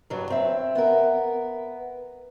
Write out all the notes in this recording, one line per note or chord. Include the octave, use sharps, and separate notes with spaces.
G2 F#3
C4 E5
B3 A#4